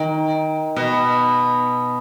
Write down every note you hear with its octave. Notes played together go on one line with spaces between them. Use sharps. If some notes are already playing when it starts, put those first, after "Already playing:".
Already playing: D#3
B2